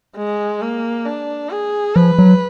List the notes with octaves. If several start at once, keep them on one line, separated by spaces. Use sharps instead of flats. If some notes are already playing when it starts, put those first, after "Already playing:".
G#3
A#3
D4
G#4
F3 B4
F#3